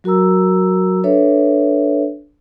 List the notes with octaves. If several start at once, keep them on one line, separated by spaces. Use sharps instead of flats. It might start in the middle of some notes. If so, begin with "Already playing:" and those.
F#3 F#4 A#4 A#5 E6
D4 A4 B4 C#5 E5